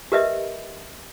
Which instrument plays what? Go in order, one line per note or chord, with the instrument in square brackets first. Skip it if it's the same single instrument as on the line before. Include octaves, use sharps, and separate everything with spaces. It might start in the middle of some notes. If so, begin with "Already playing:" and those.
[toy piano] G4 A#4 B4 D#5 E5